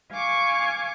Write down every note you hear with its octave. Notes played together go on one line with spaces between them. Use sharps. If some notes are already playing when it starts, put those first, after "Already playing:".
F5 G#5 C#6 D6